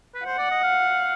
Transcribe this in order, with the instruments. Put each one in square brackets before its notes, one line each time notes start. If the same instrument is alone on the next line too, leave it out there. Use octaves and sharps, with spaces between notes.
[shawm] B4
[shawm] C5 [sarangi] F#5
[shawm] D5
D#5
F5